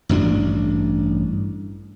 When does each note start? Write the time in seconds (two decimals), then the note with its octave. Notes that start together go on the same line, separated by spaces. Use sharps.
0.09 A1 G2 C4 D4